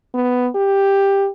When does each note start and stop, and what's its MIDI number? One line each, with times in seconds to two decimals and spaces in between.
0.14 0.48 59
0.55 1.28 67